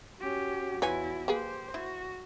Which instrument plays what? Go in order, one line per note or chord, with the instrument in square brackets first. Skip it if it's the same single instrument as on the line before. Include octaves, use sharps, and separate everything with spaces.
[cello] C#4 G4 [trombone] F#4
[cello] E2 E4 [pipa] F4 C#5 G#5 [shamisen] B4
[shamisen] A#3 G#4 B4 [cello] G4 C5
[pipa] E4 [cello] F#4